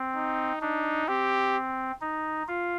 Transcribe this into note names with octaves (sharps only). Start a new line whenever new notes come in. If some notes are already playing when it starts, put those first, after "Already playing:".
Already playing: C4
D#4
D4 D#4
C4 G4
D#4
F4